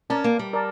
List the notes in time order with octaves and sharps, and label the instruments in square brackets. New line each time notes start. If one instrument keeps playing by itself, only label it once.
[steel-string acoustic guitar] C#4 [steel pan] A#4 D5 A5
[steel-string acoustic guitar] A#3
G3
[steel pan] A#4 D5 A5